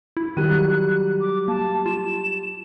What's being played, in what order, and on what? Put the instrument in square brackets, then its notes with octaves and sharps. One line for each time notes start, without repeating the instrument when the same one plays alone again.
[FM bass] E4
[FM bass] D#3 [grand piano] F#3 G3 D#7 [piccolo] F#6
[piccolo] D6
[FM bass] A#3 [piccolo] A5
[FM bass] F4 [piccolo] E7